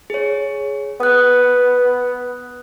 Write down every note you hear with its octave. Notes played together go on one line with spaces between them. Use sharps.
G#4 C#5
B3 D#6 F#6